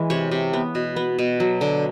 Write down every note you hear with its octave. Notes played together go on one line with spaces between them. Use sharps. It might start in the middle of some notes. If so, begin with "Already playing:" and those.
Already playing: E3 G#3
C3 C#5
C3
B3
B2
B3
B2
F#3
D3